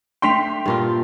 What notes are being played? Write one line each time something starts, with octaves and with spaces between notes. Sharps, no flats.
A3 D4 G5 C6 B6 F7
G2 A#2 F4